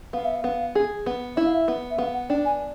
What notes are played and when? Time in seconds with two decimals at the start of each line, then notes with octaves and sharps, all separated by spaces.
0.13 B3 F5
0.25 E5
0.35 F5
0.44 B3
0.75 G#4
1.06 B3
1.36 E4 E5
1.45 F5
1.54 E5
1.68 B3
1.90 E5
1.98 B3 F5
2.14 F#5
2.29 D4 G5
2.45 G#5